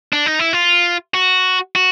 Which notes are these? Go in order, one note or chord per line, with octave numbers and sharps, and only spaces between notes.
D4
D#4
E4
F4
F#4
F#4